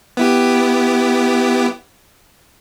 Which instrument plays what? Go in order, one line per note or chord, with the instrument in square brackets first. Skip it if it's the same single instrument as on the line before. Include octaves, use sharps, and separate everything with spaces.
[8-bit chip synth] B3 E4 G4